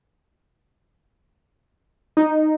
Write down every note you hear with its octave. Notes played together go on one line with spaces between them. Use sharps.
D#4